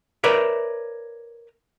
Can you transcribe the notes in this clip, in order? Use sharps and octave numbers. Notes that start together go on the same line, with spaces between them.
A#4 B4 C#5 D5 E5